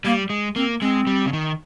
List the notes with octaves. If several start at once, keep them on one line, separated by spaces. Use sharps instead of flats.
G3 A#3
G#3
A#3 C4
G#3 C4
G3
C#3
D#3